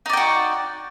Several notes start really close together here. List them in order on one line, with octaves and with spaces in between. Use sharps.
D#4 D5 G5 F#4